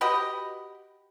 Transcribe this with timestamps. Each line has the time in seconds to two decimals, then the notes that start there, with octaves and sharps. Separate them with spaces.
0.01 F#4 G4 B4 D#5